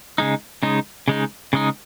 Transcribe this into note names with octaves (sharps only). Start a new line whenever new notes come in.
C#3 G#3 D#4
C#3 G#3 D#4
C#3 G#3 D#4
C#3 G#3 D#4